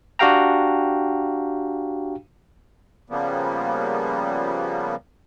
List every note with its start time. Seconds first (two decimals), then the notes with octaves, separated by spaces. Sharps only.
0.19 D4 F#4 G4 F5 G5 A#5
3.10 C#3 F3 G3 A#3 B3